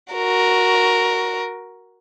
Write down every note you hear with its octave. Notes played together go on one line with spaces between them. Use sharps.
F#4 A#4